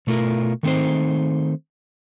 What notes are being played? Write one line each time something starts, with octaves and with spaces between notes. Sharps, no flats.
B2 A3 E4 F4 A#4
D#3 A3 C4 D#4 C5